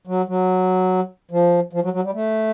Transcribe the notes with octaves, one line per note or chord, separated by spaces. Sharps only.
F#3
F#3
F3
F3
F#3
F#3
G3
A3